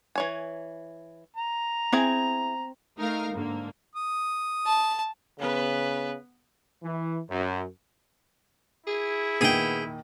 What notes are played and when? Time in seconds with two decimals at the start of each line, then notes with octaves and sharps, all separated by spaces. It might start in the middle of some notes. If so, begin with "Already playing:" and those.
0.16 E3 C#5 G#5
1.36 A#5
1.93 C4 E4 G#4 G#5
2.98 A3 D#4 A#4 F5 F6
3.33 G#2 D3 A#3
3.95 D#6
4.67 A5
5.39 C#3 B3 B4
6.83 E3
7.29 F#2
8.87 E4 G#4
9.41 A#2 D#3 B3 G#4 G5